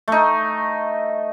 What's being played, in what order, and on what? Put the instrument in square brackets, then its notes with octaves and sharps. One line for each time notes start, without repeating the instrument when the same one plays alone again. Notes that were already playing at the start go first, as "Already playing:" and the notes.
[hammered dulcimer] A3 D#4